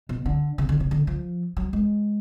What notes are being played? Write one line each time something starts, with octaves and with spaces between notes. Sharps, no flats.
B2
D3
C#3
D3
C#3
D3
F3
F#3
G#3